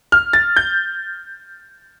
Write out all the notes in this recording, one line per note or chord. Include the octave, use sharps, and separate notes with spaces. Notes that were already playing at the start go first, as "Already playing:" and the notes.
F6
A6
G6